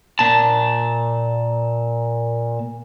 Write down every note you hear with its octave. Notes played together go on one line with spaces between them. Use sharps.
A#2 A5